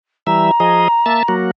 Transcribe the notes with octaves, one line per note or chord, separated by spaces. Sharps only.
E3 G3 E5 A#5
F3 G#4 D#5
A#3 E5 A5
F#3 A#3 F#4